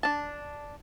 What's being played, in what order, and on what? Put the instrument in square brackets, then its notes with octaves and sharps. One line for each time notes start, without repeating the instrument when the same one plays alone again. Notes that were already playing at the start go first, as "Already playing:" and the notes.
[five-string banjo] D4 A5